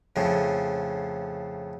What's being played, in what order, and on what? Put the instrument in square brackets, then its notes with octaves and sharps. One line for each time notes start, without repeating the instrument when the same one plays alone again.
[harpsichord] F2 A2 C#3 F3